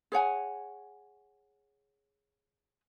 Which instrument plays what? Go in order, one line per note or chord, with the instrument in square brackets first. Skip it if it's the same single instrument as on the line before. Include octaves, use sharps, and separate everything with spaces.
[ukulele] G#4 C#5 F#5 G#5